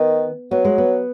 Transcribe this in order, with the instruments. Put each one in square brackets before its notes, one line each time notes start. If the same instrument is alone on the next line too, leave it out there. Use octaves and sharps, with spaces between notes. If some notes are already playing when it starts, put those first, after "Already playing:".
Already playing: [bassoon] D#3 [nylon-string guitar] B3
[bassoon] F#3 [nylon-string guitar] B3
[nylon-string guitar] G#3
B3